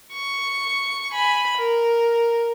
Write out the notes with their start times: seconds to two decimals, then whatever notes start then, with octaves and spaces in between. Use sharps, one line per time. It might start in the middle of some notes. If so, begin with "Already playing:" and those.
0.13 C#6
1.12 G#5 B5
1.57 A#4